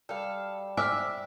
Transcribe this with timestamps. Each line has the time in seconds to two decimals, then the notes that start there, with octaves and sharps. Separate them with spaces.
0.09 G3 A4 F5
0.77 C5 E5 G#5 D6 E6 F6